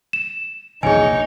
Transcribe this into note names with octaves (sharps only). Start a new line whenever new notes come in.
E7
A#1 E2 C3 D#4 G#4 C#5 G#5